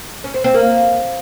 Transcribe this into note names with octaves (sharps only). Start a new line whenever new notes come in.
C#4
C4
C4
A#3